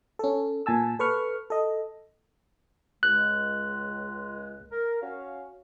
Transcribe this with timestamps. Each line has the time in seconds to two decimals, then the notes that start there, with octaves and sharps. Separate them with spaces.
0.19 C#4 A4
0.66 A#2 G#5 A5 E6
0.99 A4 B4 C#6 F6
1.50 A4 D#5
3.03 C#2 G#3 F#6
4.70 A#4
5.02 C#4 F#4 F5